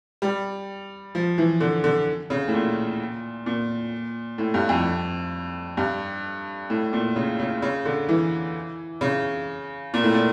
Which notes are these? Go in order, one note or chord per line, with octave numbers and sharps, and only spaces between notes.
G3
F3
E3
D3
D3
C#3
A2
A#2
A#2
A2
G2
F2
G2
A2
A#2
C#3
C#3
C#3
D3
E3
C#3
A#2
A2
A#2